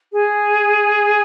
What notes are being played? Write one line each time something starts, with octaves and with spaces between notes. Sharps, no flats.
G#4